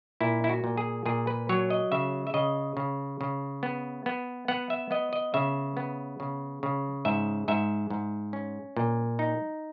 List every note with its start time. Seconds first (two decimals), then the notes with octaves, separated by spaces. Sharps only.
0.21 A#2 E4
0.44 E4
0.49 F#4
0.64 A#2
0.77 G#4
1.06 A#2 G#4
1.27 B4
1.49 F#3 C#5
1.70 D#5
1.92 C#3 E5
2.27 E5
2.34 C#3 D#5
2.77 C#3
3.21 C#3
3.63 B3
4.06 B3
4.48 B3 F#5
4.70 E5
4.91 B3 D#5
5.13 D#5
5.34 C#3 E5
5.77 B3
6.20 C#3
6.63 C#3
7.05 G#2 E5
7.48 G#2 E5
7.90 G#2
8.33 C#4
8.77 A#2
9.19 D#4